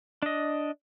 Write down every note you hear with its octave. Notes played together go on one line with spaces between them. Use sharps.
D4 D#5